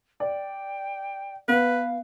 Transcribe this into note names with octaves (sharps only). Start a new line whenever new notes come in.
D5 G5
B3 B4 F5